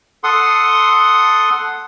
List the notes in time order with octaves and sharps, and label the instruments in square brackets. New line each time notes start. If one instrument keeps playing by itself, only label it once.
[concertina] A4 F#5 C6 D#6